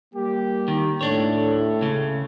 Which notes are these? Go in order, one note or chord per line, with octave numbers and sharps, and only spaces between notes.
G3 A#3 G4
D#3
A2 A3 D4 A4 C#5
C#2 C#3